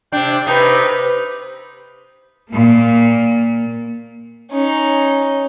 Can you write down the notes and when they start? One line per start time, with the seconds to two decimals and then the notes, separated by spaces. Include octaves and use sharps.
0.12 C3 D4 G5
0.47 C3 D#4 B4
2.51 A#2 A#3
4.51 C#4 D#4